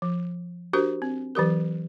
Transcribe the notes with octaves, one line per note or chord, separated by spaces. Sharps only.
F3
D4 F#4 G4 A#4 C5
C4
E3 F#3 G4 A#4